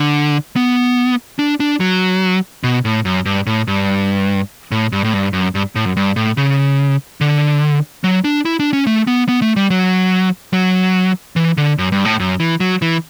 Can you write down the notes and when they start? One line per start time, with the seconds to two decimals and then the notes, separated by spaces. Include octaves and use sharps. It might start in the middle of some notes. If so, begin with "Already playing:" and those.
Already playing: D3
0.56 B3
1.39 D4
1.60 D4
1.80 F#3
2.64 B2
2.85 A2
3.05 F#2
3.26 G2
3.46 A2
3.68 G2
4.72 A2
4.92 G2
5.04 A2
5.13 G2
5.33 F#2
5.55 G2
5.76 A2
5.85 F#2
5.97 G2
6.16 A2
6.37 C#3
7.21 D3
8.04 F#3
8.24 D4
8.45 E4
8.60 D4
8.73 C#4
8.87 A3
9.07 B3
9.28 B3
9.42 A3
9.56 G3
9.70 F#3
10.53 F#3
11.36 E3
11.57 D3
11.78 F#2
11.92 G2
12.05 A2
12.20 F#2
12.40 E3
12.60 F#3
12.82 E3